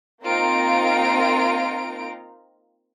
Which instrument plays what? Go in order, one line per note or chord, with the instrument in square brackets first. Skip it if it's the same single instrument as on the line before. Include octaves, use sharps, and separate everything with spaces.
[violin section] A#3 C4 D#4 F4 A#5 D7